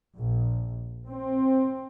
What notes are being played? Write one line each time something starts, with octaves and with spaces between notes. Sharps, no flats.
A#1
C4